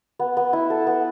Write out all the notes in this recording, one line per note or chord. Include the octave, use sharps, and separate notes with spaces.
B3
B3
E4
A4
B3